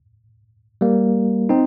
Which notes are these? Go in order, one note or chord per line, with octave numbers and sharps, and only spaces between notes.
G3 A#3
C4 D#4